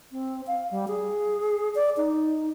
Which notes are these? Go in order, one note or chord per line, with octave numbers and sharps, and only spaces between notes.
C4
F5
G3
G#4
D5
D#4